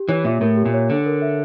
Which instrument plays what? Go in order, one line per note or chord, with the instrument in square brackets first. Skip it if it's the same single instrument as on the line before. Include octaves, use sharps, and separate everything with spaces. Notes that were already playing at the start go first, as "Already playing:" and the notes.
Already playing: [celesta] G4
[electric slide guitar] E3 [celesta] C#5
[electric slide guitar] A#2 [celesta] E5
[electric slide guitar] A2 [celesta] A#4
[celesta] G4
[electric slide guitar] A#2
[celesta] C#5
[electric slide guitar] D3 [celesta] D4
[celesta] A#4
E5